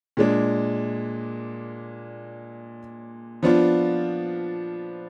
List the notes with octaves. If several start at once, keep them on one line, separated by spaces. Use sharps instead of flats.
A#2 G#3 D4
F3 B3 D4 F4